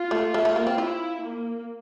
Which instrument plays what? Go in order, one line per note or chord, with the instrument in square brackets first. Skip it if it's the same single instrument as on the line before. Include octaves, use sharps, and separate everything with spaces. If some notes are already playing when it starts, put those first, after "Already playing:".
Already playing: [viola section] F4
[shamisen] A3
A3
A3
A#3
C4
[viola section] E4 [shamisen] F4
[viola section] A#3